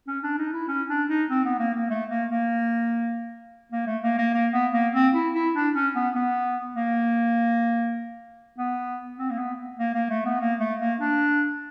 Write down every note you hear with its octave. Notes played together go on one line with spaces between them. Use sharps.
C#4
D4
D#4
E4
C#4
D4
D#4
C4
B3
A#3
A#3
A3
A#3
A#3
A#3
A3
A#3
A#3
A#3
B3
A#3
C4
E4
E4
D4
C#4
B3
B3
A#3
B3
C4
A#3
B3
A#3
A#3
A3
B3
A#3
A3
A#3
D4